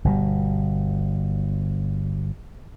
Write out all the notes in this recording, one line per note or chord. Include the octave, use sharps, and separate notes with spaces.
G1 B2 G3